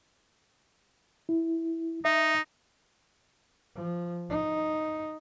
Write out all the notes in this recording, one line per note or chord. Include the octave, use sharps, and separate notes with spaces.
E4
D#4 E5
F3
D#4